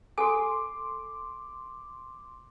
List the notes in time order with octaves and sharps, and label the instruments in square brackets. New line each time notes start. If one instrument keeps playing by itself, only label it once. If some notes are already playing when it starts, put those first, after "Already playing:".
[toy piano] A4 G#5 [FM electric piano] C6 D6